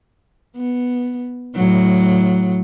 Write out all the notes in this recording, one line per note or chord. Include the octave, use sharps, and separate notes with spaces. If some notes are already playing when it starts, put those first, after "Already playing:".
B3
A2 F#3